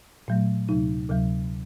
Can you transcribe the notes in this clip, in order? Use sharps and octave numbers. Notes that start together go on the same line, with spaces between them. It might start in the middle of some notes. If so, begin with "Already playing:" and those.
A#2 F#3 A3
D2 C3 F#3 D#4
D2 C3 F#3